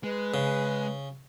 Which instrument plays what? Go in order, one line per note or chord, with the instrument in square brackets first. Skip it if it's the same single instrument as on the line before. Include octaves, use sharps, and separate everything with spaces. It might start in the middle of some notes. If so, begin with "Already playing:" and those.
[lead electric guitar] G#3 [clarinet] B4
[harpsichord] C#3